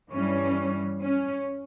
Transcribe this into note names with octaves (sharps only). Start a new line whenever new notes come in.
G2 E3 G3 C#4
C#4